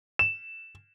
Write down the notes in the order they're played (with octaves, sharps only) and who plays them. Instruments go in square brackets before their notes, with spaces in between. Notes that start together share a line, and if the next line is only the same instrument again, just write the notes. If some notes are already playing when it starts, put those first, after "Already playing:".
[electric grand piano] E7